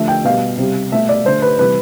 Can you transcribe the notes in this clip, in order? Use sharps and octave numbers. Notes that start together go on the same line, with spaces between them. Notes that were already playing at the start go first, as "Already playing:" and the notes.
Already playing: D3 F3 A3 E5
G5
B2 G3 F5
C3 G3
B2 A3 E5
D5
D3 A3 C5
B4
C3 E3 G3 B4